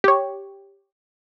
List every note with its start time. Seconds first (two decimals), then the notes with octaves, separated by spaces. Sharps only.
0.04 G4 C#5